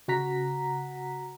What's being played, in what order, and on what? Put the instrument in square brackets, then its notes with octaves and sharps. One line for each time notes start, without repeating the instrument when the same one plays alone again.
[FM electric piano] C#3 F#4 F#5 A#5 B6